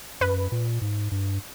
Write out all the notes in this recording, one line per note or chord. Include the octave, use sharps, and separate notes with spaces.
F#2 B4
A#2
G#2
G2